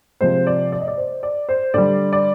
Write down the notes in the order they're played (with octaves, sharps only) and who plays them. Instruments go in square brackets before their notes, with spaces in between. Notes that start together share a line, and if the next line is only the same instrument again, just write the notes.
[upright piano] C3 F3 G#3 C5
D5
D5
D#5
D5
C5
D5
C5
D3 G3 D5
D5